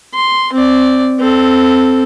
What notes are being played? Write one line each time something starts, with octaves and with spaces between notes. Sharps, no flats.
C6
C4 D5
C4 A4